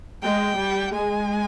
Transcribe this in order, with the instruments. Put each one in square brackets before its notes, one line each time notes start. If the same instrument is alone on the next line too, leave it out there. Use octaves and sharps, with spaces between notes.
[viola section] G#3 [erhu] G5
[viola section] G3
[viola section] G#3 [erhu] G#5